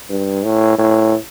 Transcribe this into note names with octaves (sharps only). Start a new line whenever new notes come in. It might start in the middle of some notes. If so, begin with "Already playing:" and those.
G2
A2
A2